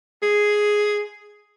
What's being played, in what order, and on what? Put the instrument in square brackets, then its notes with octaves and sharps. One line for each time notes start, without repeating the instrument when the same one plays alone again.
[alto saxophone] G#4